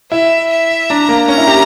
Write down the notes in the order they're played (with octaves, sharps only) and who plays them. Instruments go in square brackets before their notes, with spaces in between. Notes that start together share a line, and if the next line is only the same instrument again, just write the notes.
[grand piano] E4 [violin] E5
[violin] E5
[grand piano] D4 [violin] A#5
[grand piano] A#3
[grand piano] C#4 [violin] A#5
[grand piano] E4
G4